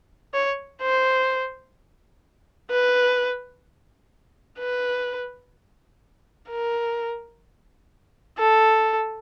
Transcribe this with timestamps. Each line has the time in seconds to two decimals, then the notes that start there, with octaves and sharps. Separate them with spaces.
0.34 C#5
0.82 C5
2.71 B4
4.60 B4
6.49 A#4
8.39 A4